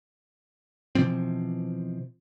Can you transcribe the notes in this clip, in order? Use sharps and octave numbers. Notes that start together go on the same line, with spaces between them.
B2 E3 F3 C4